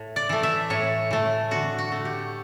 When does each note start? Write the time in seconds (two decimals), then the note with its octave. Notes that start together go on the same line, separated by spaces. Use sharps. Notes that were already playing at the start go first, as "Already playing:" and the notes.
Already playing: A2
0.16 D5
0.29 E3 A3
0.43 E5
0.70 A2 C#5
1.11 E3 A3
1.51 D3 F#4
1.78 F#4
1.92 A3
2.05 G4